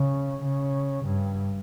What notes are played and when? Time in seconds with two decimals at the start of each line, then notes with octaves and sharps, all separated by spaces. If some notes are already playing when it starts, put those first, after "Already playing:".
Already playing: C#3
0.44 C#3
1.05 G2